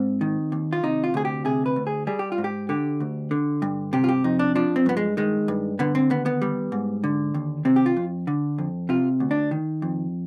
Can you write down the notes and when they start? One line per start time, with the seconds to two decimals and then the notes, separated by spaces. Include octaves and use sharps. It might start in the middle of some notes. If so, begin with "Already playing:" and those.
Already playing: G#2 C4
0.21 D#3
0.52 D#2
0.73 F4
0.83 C3 D#4
1.04 F4
1.14 D2 G#4
1.25 G4
1.45 C3 G#4
1.66 B4
1.76 D2
1.87 G#4
2.07 G3 G#4
2.19 G4
2.32 F4
2.38 G#2
2.44 G4
2.69 D3 G4
3.00 D2
3.31 D3
3.62 G2
3.93 C3 G4
4.04 F4
4.09 G4
4.24 F2 D#4
4.39 D4
4.55 F3 D4
4.76 C4
4.86 G2 B3
4.97 G#3
5.17 D#3 G#3
5.48 G2
5.79 D3 B3
5.95 C4
6.10 D#2 B3
6.26 B3
6.42 G3
6.72 G#2
7.04 D3
7.34 D#2
7.65 C3 C4
7.76 G4
7.86 F4
7.97 F2
8.27 D3
8.58 F2
8.89 C3 F4
9.20 D2
9.31 D4
9.51 D#3
9.82 F2